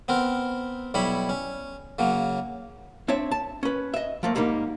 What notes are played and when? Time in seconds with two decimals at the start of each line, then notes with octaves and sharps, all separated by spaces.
0.08 B3 C4 A#4
0.94 B1 G3 E4 C#5 B5
1.29 C#4
1.99 C#3 F#3 A#3
3.08 C4 D4 C#5 E5
3.32 A5
3.63 C#4 B4
3.94 D#5 E5
4.23 F3 A3 A#3
4.35 G#2 G3 A#3 B3 D#4